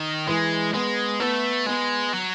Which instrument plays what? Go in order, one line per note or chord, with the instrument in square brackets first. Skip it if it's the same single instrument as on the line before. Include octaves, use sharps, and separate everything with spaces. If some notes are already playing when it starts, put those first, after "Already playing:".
Already playing: [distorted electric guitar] D#3
[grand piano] E3 [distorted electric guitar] G#3
[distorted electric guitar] G#3 [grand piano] B3
[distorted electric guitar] A3 [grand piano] B3
[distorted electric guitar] G#3 [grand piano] B3
[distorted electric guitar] F#3